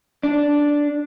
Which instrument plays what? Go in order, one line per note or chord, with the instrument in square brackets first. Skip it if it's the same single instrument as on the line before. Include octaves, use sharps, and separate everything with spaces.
[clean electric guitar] D4